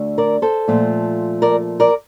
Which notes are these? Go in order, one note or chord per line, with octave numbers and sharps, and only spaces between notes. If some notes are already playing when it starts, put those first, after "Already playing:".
Already playing: D2 D3 A3
A#4 D5
A4 C5
A#2 F3 A3
A#4 D5
A#4 D5